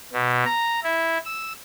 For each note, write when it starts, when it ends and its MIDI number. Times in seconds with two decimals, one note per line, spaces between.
0.13 0.44 47
0.46 0.80 82
0.83 1.18 64
1.25 1.52 88